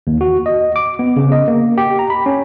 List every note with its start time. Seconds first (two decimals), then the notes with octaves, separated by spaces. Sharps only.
0.07 D#2
0.21 F#4
0.46 D#5
0.76 D6
0.99 B3
1.16 C#3
1.32 D#5
1.48 A#3
1.78 G4
1.99 A#5
2.10 B5
2.26 C#4